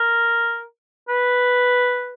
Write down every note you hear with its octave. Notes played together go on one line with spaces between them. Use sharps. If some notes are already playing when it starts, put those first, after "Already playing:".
Already playing: A#4
B4